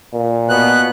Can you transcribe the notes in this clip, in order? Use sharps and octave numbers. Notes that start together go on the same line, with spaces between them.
A#2
B2 B3 F#6